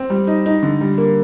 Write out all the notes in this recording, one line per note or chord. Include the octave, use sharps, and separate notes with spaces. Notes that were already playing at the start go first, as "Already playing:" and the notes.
Already playing: C4
G3
D#4
D#4
D3
G3
A#3